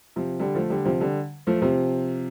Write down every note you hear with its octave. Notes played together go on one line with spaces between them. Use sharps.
C3 F3
D3 G3
F3 A3
D3 G3
C3 F3
D3 G3
F3 A3
C3 F3